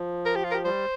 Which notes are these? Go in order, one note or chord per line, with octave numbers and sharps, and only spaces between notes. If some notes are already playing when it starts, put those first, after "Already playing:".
Already playing: F3
A#4
G4
F4
A#4
G4
G3 C5